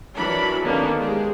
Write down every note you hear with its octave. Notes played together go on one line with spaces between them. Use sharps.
E3 F#3 D4 A#4 B5
D3 D#3 A#3 B3 C#4 D4
G#3 G4 G#4